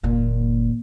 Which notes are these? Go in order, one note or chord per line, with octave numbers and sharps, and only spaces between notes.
F#1 D#2 A#2